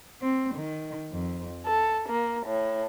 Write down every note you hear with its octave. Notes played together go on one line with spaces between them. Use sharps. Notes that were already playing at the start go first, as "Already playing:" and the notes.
C4
D#3
F2
A4
A#3
A2